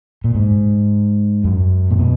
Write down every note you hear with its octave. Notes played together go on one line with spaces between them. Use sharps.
A#2
G#2
F#2
A#2
B2